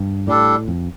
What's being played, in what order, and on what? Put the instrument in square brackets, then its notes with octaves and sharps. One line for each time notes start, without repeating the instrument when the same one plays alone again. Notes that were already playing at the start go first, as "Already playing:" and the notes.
Already playing: [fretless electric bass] G2
[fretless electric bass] A2 [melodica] G3 D4 A4
[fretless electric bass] F2